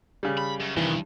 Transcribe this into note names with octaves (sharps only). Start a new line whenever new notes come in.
C#3 G3
B5
F#2
C2 G2 D#3 E3